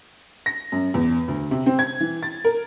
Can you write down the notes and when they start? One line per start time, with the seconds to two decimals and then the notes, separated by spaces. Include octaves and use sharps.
0.46 A#6
0.72 F#2
0.94 E2
1.28 D2
1.51 C3
1.66 C4
1.79 G#6
2.00 E3
2.23 A6
2.45 A#4